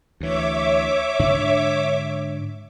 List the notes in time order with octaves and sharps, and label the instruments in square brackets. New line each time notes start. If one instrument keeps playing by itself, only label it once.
[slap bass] D2 E3 [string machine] C#5 E5 D6
[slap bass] G#2 D3 D4